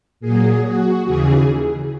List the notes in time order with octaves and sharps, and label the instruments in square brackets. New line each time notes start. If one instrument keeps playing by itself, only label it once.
[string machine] A#2 F#3 G#4
F#4
D#2 C#3 E3 G#4